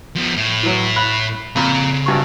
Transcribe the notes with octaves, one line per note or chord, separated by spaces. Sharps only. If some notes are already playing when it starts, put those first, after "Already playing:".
F3 B3
A2
E3 F#3
B5 F#6
F2 A#2 C#3 B5
G#1 G2 C#6